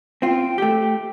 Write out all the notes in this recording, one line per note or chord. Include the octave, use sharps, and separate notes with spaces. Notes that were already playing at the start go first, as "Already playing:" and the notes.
C4 F4 G5
A3 G4